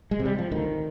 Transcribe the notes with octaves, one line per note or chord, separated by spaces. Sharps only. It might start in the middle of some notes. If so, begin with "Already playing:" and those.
G#3
C3
G3
F3
D2 D#3